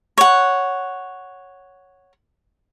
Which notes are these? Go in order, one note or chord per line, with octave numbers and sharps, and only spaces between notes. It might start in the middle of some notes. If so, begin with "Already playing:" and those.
C#5 F#5